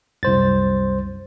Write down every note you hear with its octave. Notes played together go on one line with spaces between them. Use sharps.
C2 F#2 C5 A6